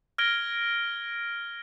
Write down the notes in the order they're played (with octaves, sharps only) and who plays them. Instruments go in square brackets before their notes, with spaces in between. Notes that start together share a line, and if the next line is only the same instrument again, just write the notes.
[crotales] F6 G#6 A#6 D7 G7